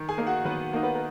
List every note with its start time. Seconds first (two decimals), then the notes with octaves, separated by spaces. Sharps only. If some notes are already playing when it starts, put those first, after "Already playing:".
Already playing: D#3
0.09 G#4 G#5
0.18 A#3 D#4
0.27 F#4 F#5
0.45 D#3 B3 B4
0.73 A#3 D#4
0.83 B3 B4
0.95 A#4